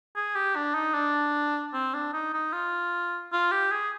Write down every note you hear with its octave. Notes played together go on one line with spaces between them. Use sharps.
G#4
G4
D4
D#4
D4
C4
D4
D#4
D#4
F4
F4
G4
G#4